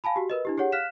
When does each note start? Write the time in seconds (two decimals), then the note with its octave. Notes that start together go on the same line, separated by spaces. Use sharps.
0.04 F5 G#5 A5 B5
0.16 F#4 G4
0.30 A#4 B4 D#5
0.45 D4 E4 G4
0.58 G4 G#4 C#5 F#5
0.72 F5 F6 F#6 B6 E7